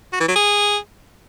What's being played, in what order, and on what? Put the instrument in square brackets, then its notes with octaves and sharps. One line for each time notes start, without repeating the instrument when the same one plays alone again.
[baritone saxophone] F#4
E3
F#3
G#4